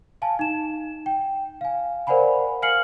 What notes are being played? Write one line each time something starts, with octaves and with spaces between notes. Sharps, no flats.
F5 G#5 A5
D#4 E7
G5
F5 G#5
A#4 C5 D5 F#5 G#5 B5
F5 G#5 F6 C7 C#7 F#7